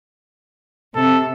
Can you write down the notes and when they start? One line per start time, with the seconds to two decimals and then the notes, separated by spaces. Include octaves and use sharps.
0.96 C3 A4